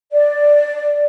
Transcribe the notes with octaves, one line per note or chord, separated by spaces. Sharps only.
D5